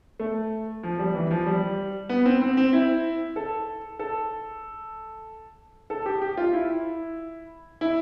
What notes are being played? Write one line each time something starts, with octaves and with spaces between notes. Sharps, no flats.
A3
F3
G3
E3
F3
G3
B3
C4
C4
C4
E4
A4
A4
A4
G4
G4
F4
E4
E4